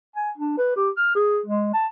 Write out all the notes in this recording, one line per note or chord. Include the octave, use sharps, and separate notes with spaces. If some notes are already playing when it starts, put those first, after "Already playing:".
G#5
D4
B4
G4
F6
G#4
G#3
A5